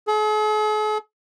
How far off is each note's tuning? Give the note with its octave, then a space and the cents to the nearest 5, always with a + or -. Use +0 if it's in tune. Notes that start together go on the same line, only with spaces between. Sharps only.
G#4 +45